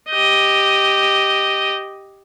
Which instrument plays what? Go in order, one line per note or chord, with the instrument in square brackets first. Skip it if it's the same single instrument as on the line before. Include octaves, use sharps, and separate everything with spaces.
[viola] G4 D#5